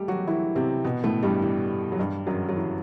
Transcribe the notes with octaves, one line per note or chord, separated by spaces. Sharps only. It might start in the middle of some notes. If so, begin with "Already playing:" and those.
Already playing: G3 A3 G4 A4
F#3 F#4
E3 E4
C3 C4
B2 B3
A2 A3
G2 G3
E3
F#3
G2 G3
F#2 F#3
F#3
E3